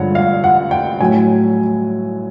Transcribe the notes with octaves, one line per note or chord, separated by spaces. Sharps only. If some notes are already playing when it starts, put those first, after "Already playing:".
Already playing: G2 D3 F3 G#3 C#5 F#5
F5
F#5
G5
A2 F#3 G#5